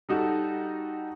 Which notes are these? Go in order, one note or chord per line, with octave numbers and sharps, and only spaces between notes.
G3 D#4 F#4 A4